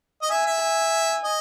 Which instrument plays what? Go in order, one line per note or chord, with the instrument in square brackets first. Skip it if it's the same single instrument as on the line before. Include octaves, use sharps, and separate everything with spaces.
[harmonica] D#5
[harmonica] E5 [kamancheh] G#5
[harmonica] E5
[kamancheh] G#5
[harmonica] D#5